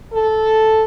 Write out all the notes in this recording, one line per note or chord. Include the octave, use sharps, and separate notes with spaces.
A4